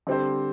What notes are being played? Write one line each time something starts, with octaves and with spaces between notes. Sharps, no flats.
D3 G3 C4 G4 C5